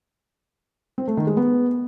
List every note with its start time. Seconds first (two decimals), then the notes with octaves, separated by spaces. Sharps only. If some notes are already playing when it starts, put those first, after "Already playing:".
0.98 C4
1.08 A3
1.17 D#3
1.27 G#3
1.37 B3